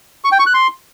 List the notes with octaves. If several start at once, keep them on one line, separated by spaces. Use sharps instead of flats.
C#6
G5
C#6
F#6
C6